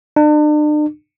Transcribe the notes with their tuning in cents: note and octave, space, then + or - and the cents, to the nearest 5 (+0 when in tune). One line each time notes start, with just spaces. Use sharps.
D4 +40